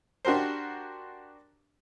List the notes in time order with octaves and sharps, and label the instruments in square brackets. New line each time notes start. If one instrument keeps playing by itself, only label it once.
[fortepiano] D4 F#4 G4 A#4 C5